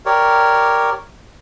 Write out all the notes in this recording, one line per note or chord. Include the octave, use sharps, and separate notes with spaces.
G4 A#4 C#5 D5